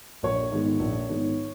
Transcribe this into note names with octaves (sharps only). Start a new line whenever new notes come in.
A#1 C#5
G#2 D#3 G#3 B3
A#1
G#2 D#3 G#3 B3